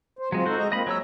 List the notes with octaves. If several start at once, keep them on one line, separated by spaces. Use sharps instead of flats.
C5
F#3 G#3 C4 F4
D#4 F#4 A4 C5
G#3 D#5 A#5
A#3 C4 F4 D#5 B5
F#3 G#3 C#5 A#5 E6